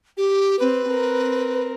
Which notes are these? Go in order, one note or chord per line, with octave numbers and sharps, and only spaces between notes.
G4
C4 B4
C4 A#4